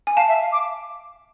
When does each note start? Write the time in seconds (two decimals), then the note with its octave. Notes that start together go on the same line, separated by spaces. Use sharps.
0.07 G#5
0.17 F5 A5
0.28 E5
0.41 F5
0.52 D6